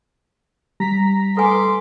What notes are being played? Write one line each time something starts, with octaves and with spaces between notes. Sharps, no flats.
G3 A#5 B6
A4 B4 G#5 C6 D6